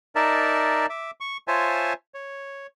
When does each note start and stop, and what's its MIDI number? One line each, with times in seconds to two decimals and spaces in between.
0.15 0.86 63
0.15 0.86 70
0.15 0.86 74
0.15 0.86 76
0.15 0.86 81
0.90 1.11 76
0.90 1.11 86
1.21 1.37 85
1.48 1.93 65
1.48 1.93 72
1.48 1.93 73
1.48 1.93 76
1.48 1.93 80
1.48 1.93 81
2.14 2.67 73